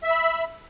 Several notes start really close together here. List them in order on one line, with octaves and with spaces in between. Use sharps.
E5 E6 B5